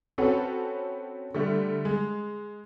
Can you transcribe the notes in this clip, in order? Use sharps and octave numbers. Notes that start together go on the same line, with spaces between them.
C4 C#4 F#4 A4 B4
D3 G3 A3
G#3